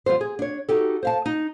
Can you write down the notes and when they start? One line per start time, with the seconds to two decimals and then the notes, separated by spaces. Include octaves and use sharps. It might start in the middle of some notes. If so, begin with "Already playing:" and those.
0.06 F3 G3 B3 C5
0.21 G#4
0.39 D4 C#5
0.69 D#4 F#4 G4 A4
1.03 C5 F5 A5
1.26 D#4